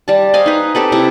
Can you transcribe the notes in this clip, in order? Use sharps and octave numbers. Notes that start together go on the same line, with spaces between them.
G3 A5
C5 D#5 F5 G#5
D#4 B4
C4 G4 A4 B4
C3 E4 A4